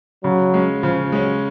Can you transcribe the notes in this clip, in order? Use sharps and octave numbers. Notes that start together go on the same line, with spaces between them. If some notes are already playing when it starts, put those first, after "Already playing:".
C#3 F#3
G#3 C#4
C#3 F3
F#3 G#3 C#4